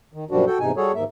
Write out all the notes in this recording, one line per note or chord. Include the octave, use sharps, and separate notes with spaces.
D#3
F#2 A#2 F3 G3 D4 F#4
F#4 A4 G5
E2 G#2 C3 D#4 G#5
G3 F#4 G#4 A4 C#5
D#2 G#2 A#3 E5